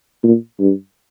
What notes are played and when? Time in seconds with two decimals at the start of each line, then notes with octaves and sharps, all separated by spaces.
0.23 A#2
0.60 G2